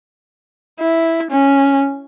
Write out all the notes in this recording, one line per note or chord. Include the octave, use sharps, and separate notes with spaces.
E4
C#4